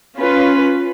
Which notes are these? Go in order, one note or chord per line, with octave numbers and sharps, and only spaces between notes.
C#4 F4 B4